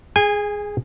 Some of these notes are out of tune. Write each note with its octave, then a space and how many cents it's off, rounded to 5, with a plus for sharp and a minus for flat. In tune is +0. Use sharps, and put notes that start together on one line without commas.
G#4 +0 G#5 -30